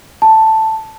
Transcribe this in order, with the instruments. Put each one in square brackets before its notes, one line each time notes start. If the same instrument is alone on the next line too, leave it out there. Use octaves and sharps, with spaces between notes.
[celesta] A5